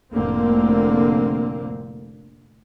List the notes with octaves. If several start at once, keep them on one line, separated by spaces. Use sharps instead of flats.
F1 A2 D3 A#3 C4